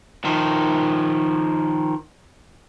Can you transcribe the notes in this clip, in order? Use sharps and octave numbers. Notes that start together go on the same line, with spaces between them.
D#3 F3